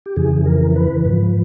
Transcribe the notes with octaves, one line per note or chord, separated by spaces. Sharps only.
G4
F2 C#3 E3 G#4
A#4
B4
G#2 F3